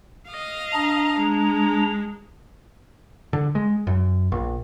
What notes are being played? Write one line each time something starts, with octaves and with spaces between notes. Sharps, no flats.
D#5 F5
D4 A#5
G#3
D3
G#3
F#2
A#1